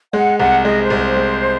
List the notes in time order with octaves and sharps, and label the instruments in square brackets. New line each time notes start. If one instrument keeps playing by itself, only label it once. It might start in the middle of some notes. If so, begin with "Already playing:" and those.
[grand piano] G#3 [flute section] F#5
[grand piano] C2 [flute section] F#5
[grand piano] G#3 [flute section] D#5
[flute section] C5
[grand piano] C2
[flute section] C5
[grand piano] G#3